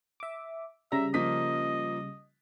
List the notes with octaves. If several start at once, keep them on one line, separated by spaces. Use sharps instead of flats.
E5 D6
C#3 G3 E5 A#5 A#6
F3 A#3 D#5 B6